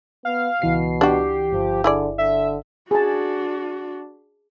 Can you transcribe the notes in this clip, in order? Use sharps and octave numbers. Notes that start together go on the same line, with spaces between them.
B3 F5
C#2 B2 E3 C7
D4 F#4 G4
G1 F3
D3 E4 G#4 D5
D3 E5
D4 F#4 G#4 A5